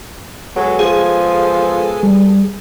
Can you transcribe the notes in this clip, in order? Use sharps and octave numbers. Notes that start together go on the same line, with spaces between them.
F#3 G#3 B3 A4
F3 G#4
G3